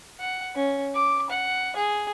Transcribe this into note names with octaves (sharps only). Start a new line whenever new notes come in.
F#5
C#4
D6
F#5
G#4